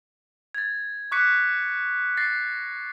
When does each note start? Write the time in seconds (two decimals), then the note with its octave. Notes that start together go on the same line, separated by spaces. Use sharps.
0.55 G#6 A6
1.12 C#6 D6 F#6 B6 C#7
2.17 A6 A#6 C7